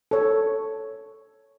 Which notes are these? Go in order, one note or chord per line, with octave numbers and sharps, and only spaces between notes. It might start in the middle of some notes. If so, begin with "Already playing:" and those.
A4 C#5